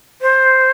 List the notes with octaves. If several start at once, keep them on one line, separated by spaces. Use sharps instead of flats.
C5